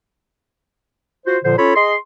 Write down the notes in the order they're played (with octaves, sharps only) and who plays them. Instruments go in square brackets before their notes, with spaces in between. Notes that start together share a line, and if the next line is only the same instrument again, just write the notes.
[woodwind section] F4 F#4 C5
A#2 D3 F3 C5
C#4 F4 A4 C#5 B5
G#4 D#5 C6